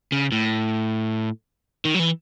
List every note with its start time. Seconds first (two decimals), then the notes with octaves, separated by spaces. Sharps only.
0.12 C#3
0.32 A2
1.85 D#3
1.94 F#3
1.99 E3